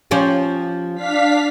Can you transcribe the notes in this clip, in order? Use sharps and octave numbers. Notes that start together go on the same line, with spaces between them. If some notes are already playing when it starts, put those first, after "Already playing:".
F3 C#4 G4
D4 F5 B6